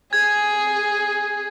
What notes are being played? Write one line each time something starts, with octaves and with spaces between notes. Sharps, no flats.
G#4 G#6